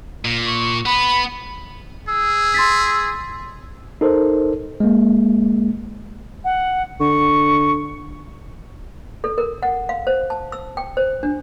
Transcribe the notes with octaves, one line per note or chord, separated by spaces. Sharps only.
A#2
C#6
B3 B5
G#4 E6
C6 A6 B6
D#4 A4 A#4 C5
G#3 A#3
F#5
D3 C#6
A4
A#4
F#5
F5
C5
A5
E6
G5
C5
D4